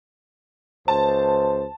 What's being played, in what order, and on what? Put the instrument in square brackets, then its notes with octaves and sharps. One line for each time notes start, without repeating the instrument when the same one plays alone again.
[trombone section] C#2 C5 [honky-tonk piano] A5